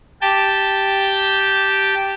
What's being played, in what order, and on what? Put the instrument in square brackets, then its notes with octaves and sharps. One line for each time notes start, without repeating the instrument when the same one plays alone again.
[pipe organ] G4 G5 A5